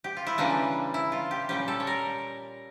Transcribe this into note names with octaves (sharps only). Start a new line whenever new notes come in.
G4
F4
E4
C#3 E3 G3 A#3 D4
E4
F4
G4
A#2 G3 C#4 G4
A4
C#5
A#4